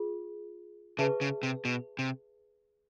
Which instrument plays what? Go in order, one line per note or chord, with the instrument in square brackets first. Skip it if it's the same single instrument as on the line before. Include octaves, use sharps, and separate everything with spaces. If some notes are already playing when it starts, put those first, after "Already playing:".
Already playing: [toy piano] F4 G#4
[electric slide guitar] C#3 [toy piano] G#4 B4 E5 A5 C#6
[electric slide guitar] C#3
C3
B2
C3